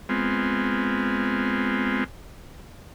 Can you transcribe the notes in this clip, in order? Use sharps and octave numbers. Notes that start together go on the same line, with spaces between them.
G#3 B3 C4 F4